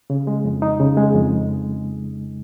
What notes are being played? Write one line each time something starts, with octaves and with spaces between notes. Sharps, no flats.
C#3
G#3
F2
D#4
C#3
G#3
F2